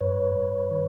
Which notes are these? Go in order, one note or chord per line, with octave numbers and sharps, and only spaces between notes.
G2 B4 C#5
G2
D#3